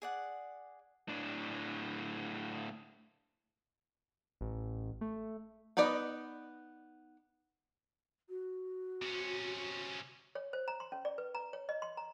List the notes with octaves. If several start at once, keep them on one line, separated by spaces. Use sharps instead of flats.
G#4 D5 F#5
A2 D4
A1
A3
B3 D#4 B4 D5 D#5
F#4
C3 C#4
C#5
C5
A#5
C6
C#4
D5
B4
A#5
C#5
D#5
C6
A#5